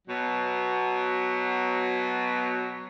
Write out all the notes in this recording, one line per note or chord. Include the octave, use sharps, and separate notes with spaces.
B2 F#3